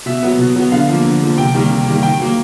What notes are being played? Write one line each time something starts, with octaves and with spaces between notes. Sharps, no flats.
B2 E5
F#3 B3
B2
F#3 B3
D3 F5
F3 A#3
D3
F3 A#3
C3 G5
D#3 G3 A#3
C3
D#3 G3 A#3
D#3 G5
F#3 A#3